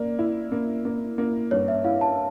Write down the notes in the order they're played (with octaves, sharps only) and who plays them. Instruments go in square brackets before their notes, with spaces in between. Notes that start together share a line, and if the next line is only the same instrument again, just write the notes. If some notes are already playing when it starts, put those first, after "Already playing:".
Already playing: [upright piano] A#3 [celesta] D5
[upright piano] E4
A#3
A#3
A#3
[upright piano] G2 [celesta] C#5
[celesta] E5
[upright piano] E4 [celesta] F5
[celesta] A5